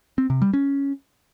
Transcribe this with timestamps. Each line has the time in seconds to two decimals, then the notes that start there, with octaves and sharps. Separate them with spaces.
0.18 C4
0.30 C3
0.42 G3
0.53 C#4